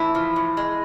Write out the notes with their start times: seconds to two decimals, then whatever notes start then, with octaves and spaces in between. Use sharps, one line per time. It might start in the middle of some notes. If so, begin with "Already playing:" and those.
Already playing: A2 E3 E4
0.15 F3
0.36 A2
0.57 G#3